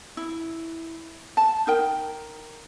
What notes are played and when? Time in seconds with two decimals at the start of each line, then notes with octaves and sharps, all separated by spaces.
0.17 E4
1.37 A5
1.67 D#4 A#4 G5